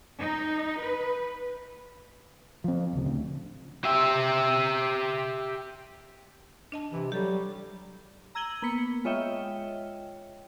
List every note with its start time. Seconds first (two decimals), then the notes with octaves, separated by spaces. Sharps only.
0.19 D#4
0.80 B4
2.64 F3 C4
2.93 D1 C#3
3.07 D2
3.85 G4 E5
6.72 D4 D#5 A5
6.92 C3 E3
7.12 F#3 G3 G4 A4
7.31 G3
8.35 A#5 E6 G#6 D#7 F#7 G7
8.62 A#3 B3 B6 C#7
9.05 G#3 F4 C#5 D#5 E5 G5